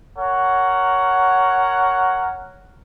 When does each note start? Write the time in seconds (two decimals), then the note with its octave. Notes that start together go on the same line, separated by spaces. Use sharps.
0.17 A#4 C#5 F#5